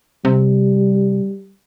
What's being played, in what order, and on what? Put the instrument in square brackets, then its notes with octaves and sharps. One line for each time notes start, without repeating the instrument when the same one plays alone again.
[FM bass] C3 [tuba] G3